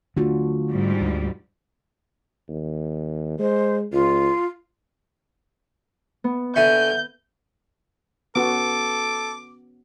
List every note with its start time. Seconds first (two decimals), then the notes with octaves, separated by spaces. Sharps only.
0.17 D3 A3 D4 F4 F#4
0.70 G#2 G3
1.01 D2
2.49 D#2
3.39 G#3 C5
3.93 C#2 F4
6.24 B3
6.56 D3 E5 F#5 G#5 C#6 G6
8.36 B3 C#4 F#4 A4 D6